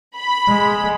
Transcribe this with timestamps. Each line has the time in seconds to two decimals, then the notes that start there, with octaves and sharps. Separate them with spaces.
0.16 B5
0.49 G#3